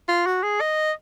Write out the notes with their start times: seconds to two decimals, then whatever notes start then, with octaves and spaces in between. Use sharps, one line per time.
0.09 F4
0.26 F#4
0.43 G#4
0.61 D#5